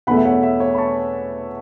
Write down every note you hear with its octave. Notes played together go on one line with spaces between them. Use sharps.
E2 B2 A3 F#5 B5
E5
C#5 F#5
E5
C#5
B5
A5 C#6